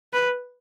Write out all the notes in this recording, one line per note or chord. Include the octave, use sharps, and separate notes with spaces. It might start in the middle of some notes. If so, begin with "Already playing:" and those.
B4